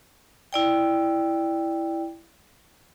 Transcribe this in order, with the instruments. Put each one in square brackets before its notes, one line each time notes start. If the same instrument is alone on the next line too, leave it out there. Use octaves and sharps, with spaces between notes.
[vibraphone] E4 D5 G5